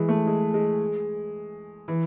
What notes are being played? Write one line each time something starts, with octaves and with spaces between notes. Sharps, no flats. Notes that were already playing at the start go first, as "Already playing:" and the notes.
Already playing: E3 G#3
A3
G#3
G#3
E3